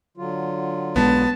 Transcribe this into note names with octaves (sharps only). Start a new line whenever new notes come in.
D3 F#3 F4
B1 D#3 G#3 B3 A5